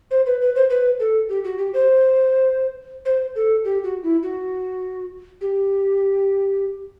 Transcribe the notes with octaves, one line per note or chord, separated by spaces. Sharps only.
C5
B4
B4
C5
B4
A4
G4
F#4
G4
C5
C5
A4
G4
F#4
E4
F#4
G4